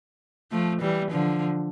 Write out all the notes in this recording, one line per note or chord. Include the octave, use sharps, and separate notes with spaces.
F3 A3
E3 G3
D3 F3